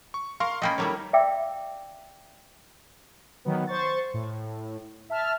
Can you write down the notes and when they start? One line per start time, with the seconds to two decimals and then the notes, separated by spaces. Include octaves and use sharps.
0.14 C#6
0.40 A#4 F5 C6 C#6
0.62 A3 A#3 C#4 D#5 G5 B5
0.78 D#3 G3 E4 A4 A#4 C#5
1.13 D5 E5 F5 G5 D6 E6
3.45 D#3 F#3 B3
3.67 C5 C#6 A6
4.14 A2
5.10 E5 A5 F6